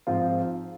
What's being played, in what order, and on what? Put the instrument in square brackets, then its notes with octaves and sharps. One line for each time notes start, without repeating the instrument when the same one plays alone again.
[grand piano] G#2 F3 C4 F4